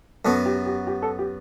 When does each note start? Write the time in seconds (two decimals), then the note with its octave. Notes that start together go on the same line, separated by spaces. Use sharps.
0.25 F#2 F#3 B3 A4
0.46 G4
0.66 G4
0.87 G4
1.02 A4
1.19 G4